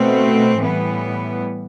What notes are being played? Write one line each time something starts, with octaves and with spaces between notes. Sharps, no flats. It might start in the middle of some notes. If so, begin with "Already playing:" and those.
Already playing: B2 A3 C4
A2 E3 G3 B3